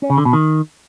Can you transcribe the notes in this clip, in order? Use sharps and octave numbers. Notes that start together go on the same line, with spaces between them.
C#4
C#3
D3
B2
D#3